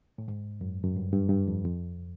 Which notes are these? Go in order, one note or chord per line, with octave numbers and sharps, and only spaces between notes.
A2
G#2
F#2
F#2
G2
G2
G2
F2
F2